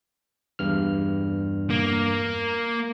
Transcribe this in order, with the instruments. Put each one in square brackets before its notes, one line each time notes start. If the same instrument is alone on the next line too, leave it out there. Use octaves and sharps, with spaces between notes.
[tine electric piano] E2 G2 F6
[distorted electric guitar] A#3